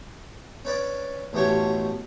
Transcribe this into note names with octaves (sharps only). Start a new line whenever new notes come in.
C#4 B4 D5
A1 B2 A3 G4 C#5